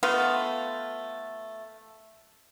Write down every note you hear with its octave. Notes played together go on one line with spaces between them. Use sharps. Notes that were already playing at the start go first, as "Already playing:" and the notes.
A3 B3 F4 F5